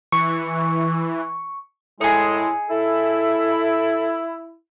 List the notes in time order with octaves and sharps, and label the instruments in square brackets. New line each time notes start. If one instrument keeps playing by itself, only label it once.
[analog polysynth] E3 [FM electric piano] C#6
[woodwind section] A2 G#3 [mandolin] D#4 G#4 [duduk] E4
[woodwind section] E4 [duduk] A4